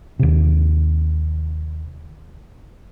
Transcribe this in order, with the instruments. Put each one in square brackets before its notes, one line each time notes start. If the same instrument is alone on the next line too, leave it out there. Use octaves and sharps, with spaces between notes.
[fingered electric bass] D#2 C3